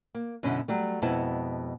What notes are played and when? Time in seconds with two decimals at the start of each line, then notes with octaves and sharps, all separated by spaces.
0.14 A#3
0.43 F#2 B2 D3 C#4 E4
0.68 F#3 G3 A3
1.02 F2 B2 G#3 B3 E4 A5